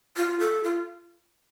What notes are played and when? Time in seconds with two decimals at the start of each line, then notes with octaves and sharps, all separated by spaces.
0.16 F4
0.40 A4
0.64 F4